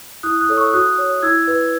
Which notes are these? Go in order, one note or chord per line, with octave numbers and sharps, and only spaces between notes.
E4 D#6 F#6
D#6 F#6
A4 C#5
C#6 E6
F#4 D#6 F#6
C#5
E4 E6 G#6
B4